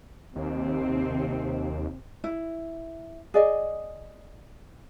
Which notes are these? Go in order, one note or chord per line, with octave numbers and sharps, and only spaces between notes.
D#2 C3 C4
E4
G#4 D5 D#5